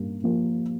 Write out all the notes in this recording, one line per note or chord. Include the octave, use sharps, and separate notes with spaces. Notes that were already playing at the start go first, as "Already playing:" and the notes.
Already playing: G2 A#3
F3 A#3